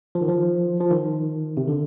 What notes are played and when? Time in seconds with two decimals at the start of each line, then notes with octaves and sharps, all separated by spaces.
0.15 F3
0.21 D#3
0.28 F3
0.80 F3
0.90 D#3
1.57 C3
1.68 D3